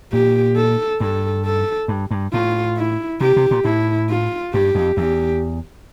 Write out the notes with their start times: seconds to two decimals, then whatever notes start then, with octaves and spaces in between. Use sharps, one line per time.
0.13 A#2 G4
0.56 A4
1.00 G2 A4
1.45 A4
1.88 G2
2.11 G2
2.33 A2 F4
2.77 E4
3.21 C3 G4
3.36 C3
3.51 A#2
3.65 A2 E4
4.10 F4
4.54 G2 G4
4.75 F2
4.97 E2 G4